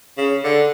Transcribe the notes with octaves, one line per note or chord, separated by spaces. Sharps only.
C#3
D3